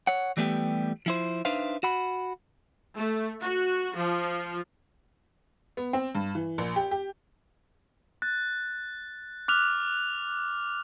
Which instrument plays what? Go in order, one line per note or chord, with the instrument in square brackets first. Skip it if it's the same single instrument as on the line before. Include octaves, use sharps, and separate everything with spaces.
[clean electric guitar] C#5 F#5
E3 G3 A3 B3 G4
F3 E4 C5
D4 D#4 B4 C5 E5 F5
F#4 F#5 B5
[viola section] A3
F#4
F3
[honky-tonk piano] B3
C4
G2
E3
A#1
G4
G4
[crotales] F#6 [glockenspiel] A6
[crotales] D6 F6 F7 [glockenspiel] F#6